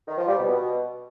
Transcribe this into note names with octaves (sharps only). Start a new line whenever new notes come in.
D#3
F3
G3
B2
B2